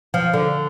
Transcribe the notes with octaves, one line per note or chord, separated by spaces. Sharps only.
F3
D3